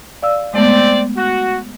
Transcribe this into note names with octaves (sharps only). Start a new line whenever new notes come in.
D5 F5 E6
G#3 A3 B3 C4 D5
F#4